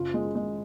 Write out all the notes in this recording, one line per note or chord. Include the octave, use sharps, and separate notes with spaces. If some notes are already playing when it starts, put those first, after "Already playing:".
Already playing: F#1 F4
G#3
G#3